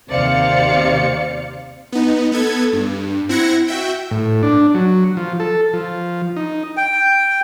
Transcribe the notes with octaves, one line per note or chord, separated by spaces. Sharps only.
D#2 C3 C5 D5 F5 C#7
B3 D#4
B3 A4 G#6
G2
C4 E4 F#5 G#6 A#6 C#7
F#4 E5 G5
A2
D4
F#3
F3
A4
F3
D#4
G5